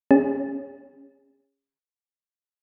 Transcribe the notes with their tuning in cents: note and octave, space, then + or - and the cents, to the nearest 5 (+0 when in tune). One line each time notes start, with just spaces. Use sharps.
C#4 -5 G#4 -35